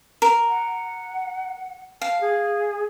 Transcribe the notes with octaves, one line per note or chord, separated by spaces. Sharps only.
A#4
F#5
F5 A5
G#4